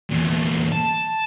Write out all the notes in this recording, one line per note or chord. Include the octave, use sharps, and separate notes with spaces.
E2 A#2
A5